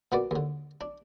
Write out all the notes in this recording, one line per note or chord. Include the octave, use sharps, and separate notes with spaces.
A#2 B3 F#4 D5
D#2 D3
D4